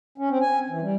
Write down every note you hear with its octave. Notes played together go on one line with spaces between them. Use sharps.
C#4
C4
G#5
E3
G3